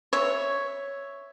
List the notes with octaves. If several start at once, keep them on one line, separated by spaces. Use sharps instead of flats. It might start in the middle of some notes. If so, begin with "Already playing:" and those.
C#5 E5